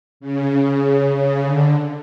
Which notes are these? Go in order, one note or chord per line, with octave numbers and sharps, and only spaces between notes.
C#3
C#3
D3